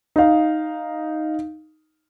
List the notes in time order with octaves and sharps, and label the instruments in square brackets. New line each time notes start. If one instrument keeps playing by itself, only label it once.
[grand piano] D#4 F5